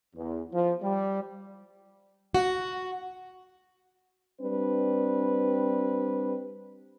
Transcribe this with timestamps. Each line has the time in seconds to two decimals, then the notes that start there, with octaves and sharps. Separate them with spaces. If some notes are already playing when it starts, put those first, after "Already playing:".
0.15 E2
0.53 F3
0.81 G3
2.34 F#4
4.41 G3 C4 D4 B4